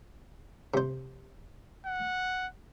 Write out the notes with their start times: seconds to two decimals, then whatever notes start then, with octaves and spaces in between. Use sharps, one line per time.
0.74 C3 C5
1.85 F#5